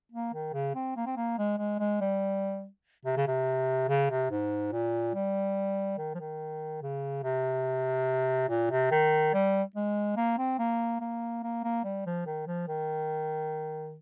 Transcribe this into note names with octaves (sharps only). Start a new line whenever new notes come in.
A#3
D#3
C#3
C4
A#3
C4
A#3
G#3
G#3
G#3
G3
C3
C#3
C3
C#3
C3
G#2
A#2
G3
D#3
F3
D#3
C#3
C3
A#2
C3
D#3
G3
G#3
A#3
C4
A#3
A#3
A#3
A#3
G3
F3
D#3
F3
D#3